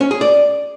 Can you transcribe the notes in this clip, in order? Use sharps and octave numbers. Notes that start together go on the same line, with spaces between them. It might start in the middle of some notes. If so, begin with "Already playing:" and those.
C#4
G#4
D5